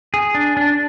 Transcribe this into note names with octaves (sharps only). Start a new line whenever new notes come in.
G#4
D4
D4